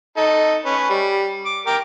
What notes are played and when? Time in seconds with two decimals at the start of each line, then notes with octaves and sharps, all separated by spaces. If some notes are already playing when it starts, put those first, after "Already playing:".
0.17 D#4 A4
0.65 C#4 B4
0.90 G3
1.46 D6
1.67 A#4 G5 D6